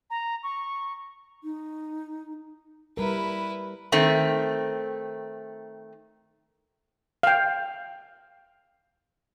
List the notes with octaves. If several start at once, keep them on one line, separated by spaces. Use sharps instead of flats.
A#5
C#6
D#4
G3 E4 A#4 B4
D#3 A3 C4
F5 G5